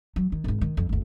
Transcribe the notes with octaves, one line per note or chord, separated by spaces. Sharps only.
F#3
D#3
G#1 D#4
D#3
F2
F#1 D2